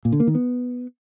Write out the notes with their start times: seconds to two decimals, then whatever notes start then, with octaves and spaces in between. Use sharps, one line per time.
0.05 A#2
0.12 D3
0.20 A#3
0.27 D#3
0.35 B3